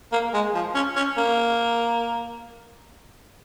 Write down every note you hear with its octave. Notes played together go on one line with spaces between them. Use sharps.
A#3
G#3
F3
C#4
C#4
A#3